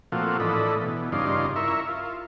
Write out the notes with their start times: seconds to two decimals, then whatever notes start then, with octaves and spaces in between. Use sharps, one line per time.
0.12 A#2 F3 A3 C4 F4 F#4
0.40 A2 E3 D4 A4 D#5 B5
0.81 B2 E3
1.12 G2 C#3 D#4 F4 D5 C6
1.56 E4 A#4 E5 C#6
1.88 F4